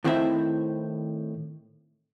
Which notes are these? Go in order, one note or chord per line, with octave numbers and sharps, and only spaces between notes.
A2 D#3 C4 E4 C5 E5